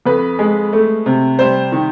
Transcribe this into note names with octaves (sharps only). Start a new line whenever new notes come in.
F2 B4
G#3
A3
C3
G3 C5
D#3